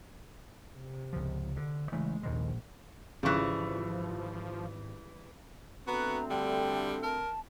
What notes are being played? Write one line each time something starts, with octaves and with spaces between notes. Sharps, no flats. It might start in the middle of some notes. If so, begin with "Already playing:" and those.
C3
C#2 F3
D3
C#3 E3 G#3 A3
A#1 D#2 D#3 G#3
G#1 C#3 E3 F3 G3 C#6 F#6
D2 A3 B3 C4 F#4 A#5
D3 G3 G5
A#4 A5